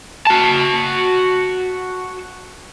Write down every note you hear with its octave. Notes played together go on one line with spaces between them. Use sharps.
F#4 A5